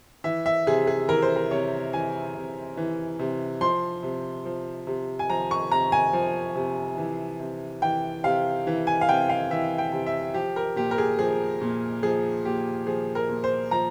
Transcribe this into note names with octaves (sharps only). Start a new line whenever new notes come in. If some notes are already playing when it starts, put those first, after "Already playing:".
E3 E5
E5
C3 G#4
G#4
E3 A#4
C5
A#4
C3 C#5
E3 G#5
C3
E3
C3
F3 C6
C3
F3
C3
G#5
F3 A#5
C#6
C3 A#5
G#5
F3
C3
E3
C3
E3 G5
C3 F5
E3
G#5
F5
C3 G5
F5
E3 E5
G5
C3
E5
F3 G4
A#4
A#2 G4
A#4
G#4
F3 G#4
A#2
F3 G#4
A#2 G4
F3 G#4
A#4
A#2
C5
F3 A#5